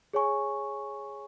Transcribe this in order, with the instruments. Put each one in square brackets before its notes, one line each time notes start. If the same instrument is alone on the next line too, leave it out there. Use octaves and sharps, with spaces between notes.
[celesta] G#4 C#5 G#5 C#6